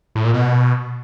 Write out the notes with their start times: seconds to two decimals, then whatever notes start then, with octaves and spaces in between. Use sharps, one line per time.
0.15 A2
0.25 A#2
0.34 B2